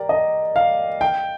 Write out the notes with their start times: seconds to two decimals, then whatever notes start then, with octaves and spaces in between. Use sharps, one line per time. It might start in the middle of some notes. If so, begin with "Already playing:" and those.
Already playing: G4 A#4 D5
0.09 D#5
0.56 F5
1.01 G5